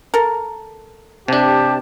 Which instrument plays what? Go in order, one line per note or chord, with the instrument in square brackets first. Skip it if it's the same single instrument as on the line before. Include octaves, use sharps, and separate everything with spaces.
[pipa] A4 A#4
[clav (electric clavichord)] C3 D4 [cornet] G4 [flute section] A5